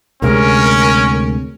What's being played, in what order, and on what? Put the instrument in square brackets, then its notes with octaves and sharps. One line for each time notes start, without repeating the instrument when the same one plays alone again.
[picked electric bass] D2 C3 G#3 [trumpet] C#4 [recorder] A#4